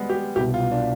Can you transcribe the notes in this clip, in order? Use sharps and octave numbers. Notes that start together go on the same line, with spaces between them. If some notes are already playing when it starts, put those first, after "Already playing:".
Already playing: G3 G#3 B3
G4
C2 B2 B3 G4
F4
D4